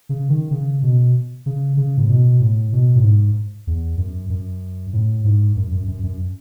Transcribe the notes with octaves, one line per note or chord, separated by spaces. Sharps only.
C#3
D#3
C#3
B2
C#3
C#3
A2
B2
A2
B2
A2
G#2
E2
F#2
F#2
A2
G#2
F#2
F#2
F#2
F#2